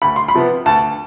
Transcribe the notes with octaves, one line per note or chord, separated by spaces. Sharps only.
D2 B5
C6
B5
C3 F3 B3
D2 A5